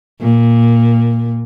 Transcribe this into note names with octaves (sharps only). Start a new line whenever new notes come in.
A#2